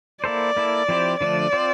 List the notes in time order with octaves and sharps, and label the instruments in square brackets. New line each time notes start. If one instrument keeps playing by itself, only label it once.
[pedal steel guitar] A#3 E4 A4 C5 [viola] D5
[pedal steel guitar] A#3 E4 A4
F3 C4 E4 G4 C5
[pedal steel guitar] D3 F3 A3 D4 [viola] D5
[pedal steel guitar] C4 F4 C5